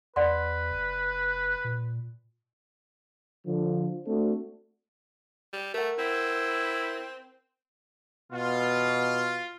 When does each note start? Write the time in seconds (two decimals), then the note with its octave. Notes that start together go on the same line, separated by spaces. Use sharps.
0.16 E2 B4 D5 F#5 C6
0.71 F#1
1.64 A#2
3.46 D3 F3
4.07 A3 C4 D4 F#4 A4
5.53 G3
5.74 A3 A#4 F#5
5.99 C4 E4
8.32 B2 F4